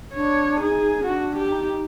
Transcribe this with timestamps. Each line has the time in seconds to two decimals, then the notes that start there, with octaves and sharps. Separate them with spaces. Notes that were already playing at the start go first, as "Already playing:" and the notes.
0.14 D4 C#5
0.60 D#4 G#4
1.00 C#4
1.06 D4 F#4
1.37 G4
1.52 D#4